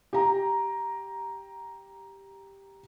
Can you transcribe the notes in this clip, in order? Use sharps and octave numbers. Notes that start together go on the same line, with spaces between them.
G4 A#5